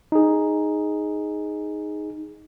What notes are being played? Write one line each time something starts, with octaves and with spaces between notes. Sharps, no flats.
D#4 G#4